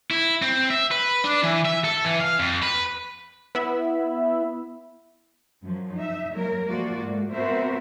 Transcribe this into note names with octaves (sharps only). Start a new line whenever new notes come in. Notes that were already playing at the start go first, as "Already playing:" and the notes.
E4
C4
E5
B4
D4
E3
E5
A4
E3
F5
F2
B4
B3 E4 E5 B5
F#2 F3 F#3
D#4 E5
F#3 G3 A#3 A#4
F3 A3 A#3 F4 F#4 D5
G#2 A3
B3 C4 F#4 A#4 C5 E5